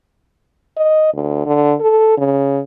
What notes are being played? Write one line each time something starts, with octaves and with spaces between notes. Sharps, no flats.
D#5
D2
D3
A4
C#3